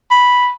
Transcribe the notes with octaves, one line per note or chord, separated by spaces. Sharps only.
B5